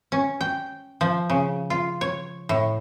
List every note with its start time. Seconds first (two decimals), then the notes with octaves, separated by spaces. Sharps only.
0.12 C#4
0.41 G5
1.01 F3
1.30 C#3
1.70 F4
2.01 C#5
2.49 A2